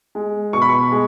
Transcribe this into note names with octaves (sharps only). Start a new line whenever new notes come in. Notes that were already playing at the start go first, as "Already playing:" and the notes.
G#3
B2 C#6
B5
C#6
G#3